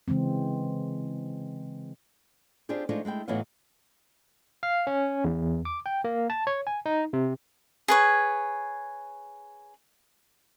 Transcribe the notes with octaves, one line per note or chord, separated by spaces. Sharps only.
C#3 E3 G#3 C4
C4 D4 F4 G4 G#4
F3 G#3 A3 D4 D#4 F4
G#3 A3 E4 G5
A2 E3 F#3 B3 D#5 F5
F5
C#4
E2
D6
G5
A#3
A5
C#5
G#5
D#4
C3
G#4 B4 C#5